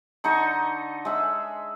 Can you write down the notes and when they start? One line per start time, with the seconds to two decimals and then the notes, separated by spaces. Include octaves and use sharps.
0.24 D3 D#4 D#5 C#6
1.05 G#3 E5